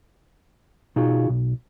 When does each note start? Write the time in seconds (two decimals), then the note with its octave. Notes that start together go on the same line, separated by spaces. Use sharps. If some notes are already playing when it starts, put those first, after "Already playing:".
0.96 B2 D#4 F4 F#4 G#4
1.29 B1